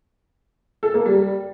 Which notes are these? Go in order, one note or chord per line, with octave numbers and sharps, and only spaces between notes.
A4
A#3
G3